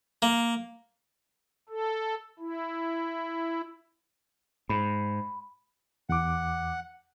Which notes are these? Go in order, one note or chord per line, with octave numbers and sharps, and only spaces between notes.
A#3
A4
E4
G#2 B5
E2 F#5 D6